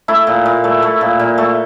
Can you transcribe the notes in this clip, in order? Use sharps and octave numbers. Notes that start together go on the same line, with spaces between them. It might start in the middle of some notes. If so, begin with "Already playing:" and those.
A3 E4
A#2
A#2
A3
A3
A#2
A#2
A3